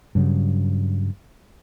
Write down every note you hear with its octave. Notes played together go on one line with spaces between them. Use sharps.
G2 C#3 F#3